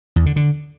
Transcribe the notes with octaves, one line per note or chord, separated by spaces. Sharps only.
E2
D3
D3